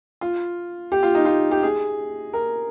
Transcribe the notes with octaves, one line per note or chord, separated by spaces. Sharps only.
F4
G4
F4
D#4
F4
G4
G#4
A#4